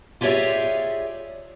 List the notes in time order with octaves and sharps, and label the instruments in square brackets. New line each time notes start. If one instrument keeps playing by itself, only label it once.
[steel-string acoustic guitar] F4 G4 G#4 C#5 D5 E5